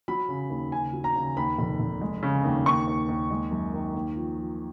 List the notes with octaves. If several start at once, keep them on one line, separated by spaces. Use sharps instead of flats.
F#3 B5
C#3
D#2
C#3 G#5
F#3
A#5
C#3
D#2 B5
F1
F1
G#3
C#3
D#2
D#2 C#6
D#2
D#2
G#3
F#2
D#3
D#2
F3
F3